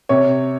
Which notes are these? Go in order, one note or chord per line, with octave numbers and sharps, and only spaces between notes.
C3 C#5